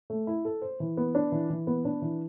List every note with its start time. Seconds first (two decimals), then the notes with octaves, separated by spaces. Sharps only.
0.10 A3
0.27 E4
0.45 A4
0.62 C5
0.80 E3
0.97 B3
1.15 D4
1.32 E3
1.50 E3
1.67 B3
1.85 D4
2.02 E3